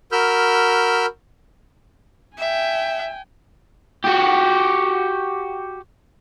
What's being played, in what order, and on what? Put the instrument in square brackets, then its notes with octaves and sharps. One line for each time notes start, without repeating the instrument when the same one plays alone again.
[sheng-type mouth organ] F#4 A#4 B5 E6 F6 G6
[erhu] E5 [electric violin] G5 G#5
[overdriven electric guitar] F#4 G4